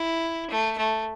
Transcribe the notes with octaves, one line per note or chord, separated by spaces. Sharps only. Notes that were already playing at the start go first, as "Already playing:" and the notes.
Already playing: E4
A3
A3